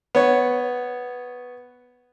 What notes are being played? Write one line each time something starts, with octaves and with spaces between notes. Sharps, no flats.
B3 C#5